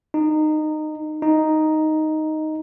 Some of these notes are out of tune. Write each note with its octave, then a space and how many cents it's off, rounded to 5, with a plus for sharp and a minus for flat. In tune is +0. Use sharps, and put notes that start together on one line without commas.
D#4 -20
D#4 +0